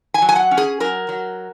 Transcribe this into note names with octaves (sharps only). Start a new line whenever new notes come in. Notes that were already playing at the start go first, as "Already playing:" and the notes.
G#5
F#3
G#5
F#5
C#4
G#4
F#3 A#4
F#3